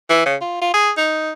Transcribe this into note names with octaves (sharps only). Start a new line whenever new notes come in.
E3
C#3
F4
F4
G#4
D#4